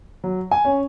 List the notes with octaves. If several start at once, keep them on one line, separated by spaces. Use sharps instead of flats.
F#3
G#5
C#4